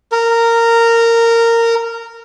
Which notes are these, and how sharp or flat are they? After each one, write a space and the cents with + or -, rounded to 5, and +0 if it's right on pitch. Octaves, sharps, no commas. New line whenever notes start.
A#4 -15